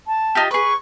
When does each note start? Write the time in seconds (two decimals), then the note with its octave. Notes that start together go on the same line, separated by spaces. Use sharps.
0.07 A5
0.35 D#4 F4 G4
0.51 G#4 B4 C#6